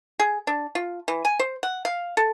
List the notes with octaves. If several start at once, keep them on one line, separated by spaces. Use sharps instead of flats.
G#4
D4
F4
E3
G#5
C5
F#5
F5
A4